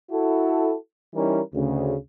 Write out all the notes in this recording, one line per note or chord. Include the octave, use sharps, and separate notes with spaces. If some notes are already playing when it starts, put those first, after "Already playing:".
E4 F#4 A4
E3 G3 C#4 D#4 E4 A#4
D2 C#3